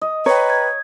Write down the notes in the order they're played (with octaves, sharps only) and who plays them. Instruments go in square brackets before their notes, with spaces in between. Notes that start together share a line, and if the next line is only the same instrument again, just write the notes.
[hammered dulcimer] D#5
[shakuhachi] B4 [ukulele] C#5 [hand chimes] G5 A#5
[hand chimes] G#6